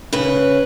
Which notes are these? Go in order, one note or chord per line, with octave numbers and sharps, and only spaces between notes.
C#3 B4